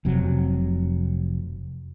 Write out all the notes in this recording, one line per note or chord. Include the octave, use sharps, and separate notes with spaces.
F1 C3 F#3